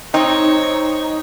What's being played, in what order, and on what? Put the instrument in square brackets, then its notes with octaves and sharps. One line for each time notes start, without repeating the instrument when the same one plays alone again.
[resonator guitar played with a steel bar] C4 [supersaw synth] D#4 [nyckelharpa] C#5